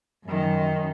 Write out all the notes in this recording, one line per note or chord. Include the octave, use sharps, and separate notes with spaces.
F#2 D#3